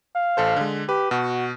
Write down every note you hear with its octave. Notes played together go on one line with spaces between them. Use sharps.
F5
A1 A4 C5
D3 G#3
G4 B4
B2 F#4